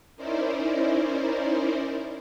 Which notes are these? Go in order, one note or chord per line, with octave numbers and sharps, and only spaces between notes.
C#4 D#4 E4 A#4 C5 D5